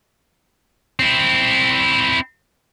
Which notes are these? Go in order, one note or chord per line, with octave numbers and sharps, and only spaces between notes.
C4 E4